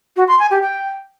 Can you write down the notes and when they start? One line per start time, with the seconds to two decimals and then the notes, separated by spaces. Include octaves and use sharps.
0.16 F#4
0.28 C6
0.39 G#5
0.51 G4
0.62 G5